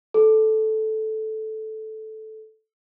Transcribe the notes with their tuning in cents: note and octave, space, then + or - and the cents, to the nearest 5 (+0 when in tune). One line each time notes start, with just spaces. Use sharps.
A4 -10